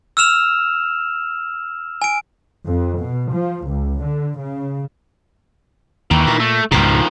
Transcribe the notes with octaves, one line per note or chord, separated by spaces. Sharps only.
E6 F6 E7 F7
G#5 D7
F2
B2
F3
C#2
D3
C#3
D#2 D#3 E3
A#2
A3
C#2 G#2 B2 D#3 F3